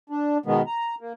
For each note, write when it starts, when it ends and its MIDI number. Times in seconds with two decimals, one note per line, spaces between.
0.10 0.38 62
0.46 0.62 47
0.46 0.62 51
0.46 0.62 56
0.46 0.62 59
0.67 0.95 82
1.01 1.13 58